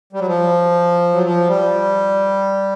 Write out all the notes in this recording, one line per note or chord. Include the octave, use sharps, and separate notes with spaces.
G3
F#3
F3
F#3
F3
G3